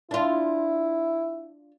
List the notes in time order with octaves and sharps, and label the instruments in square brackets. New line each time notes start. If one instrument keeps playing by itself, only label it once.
[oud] D4 F4 [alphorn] E4